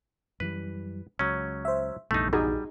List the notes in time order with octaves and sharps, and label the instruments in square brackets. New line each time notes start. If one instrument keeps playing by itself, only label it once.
[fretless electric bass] F#2 E3 G3 [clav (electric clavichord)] B4
[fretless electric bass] C#2 [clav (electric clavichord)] F#3 C#4
[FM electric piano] C5 E5
[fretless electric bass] F1 E2 G2 [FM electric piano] A#1 [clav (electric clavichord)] A3 D#4
[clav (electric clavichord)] G3 [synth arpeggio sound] D#4 F#4 G#4